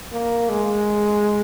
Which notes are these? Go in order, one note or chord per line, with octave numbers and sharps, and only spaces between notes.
A#3
G#3